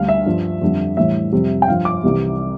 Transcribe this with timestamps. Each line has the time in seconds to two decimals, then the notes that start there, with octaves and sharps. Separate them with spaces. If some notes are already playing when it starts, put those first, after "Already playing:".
Already playing: D2 D3 G3 F5
0.08 E5
0.26 G2 F3
0.62 F2 D3 G3
0.97 A2 E3 G3 E5
1.32 F2 C3 G3
1.62 G5
1.68 G2 F3 F5
1.85 D6
2.03 C2 C3 E3 G3